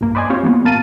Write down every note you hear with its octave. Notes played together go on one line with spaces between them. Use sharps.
B1 G2 A#3
B4 C5 D5 D#5 G#5
C4 F4 G4 C5 C#5
E3 A#3 B3
A1 A#2 A#4 F5 A5 D#7